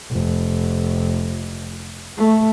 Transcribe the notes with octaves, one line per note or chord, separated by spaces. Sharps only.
F1
A3